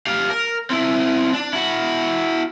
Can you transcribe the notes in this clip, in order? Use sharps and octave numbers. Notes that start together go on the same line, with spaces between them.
G4 F5
A#4
C4 E4
D4
E4 F#4